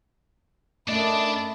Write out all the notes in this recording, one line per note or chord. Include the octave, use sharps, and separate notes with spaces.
F#2 A3 D4 E4 D5 D#5 A5